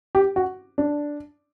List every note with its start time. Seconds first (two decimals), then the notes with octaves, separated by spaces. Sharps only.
0.15 G4
0.36 F#4
0.78 D4